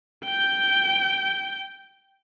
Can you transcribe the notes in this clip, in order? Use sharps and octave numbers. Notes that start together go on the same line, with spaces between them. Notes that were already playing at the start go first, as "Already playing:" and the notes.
G5 G6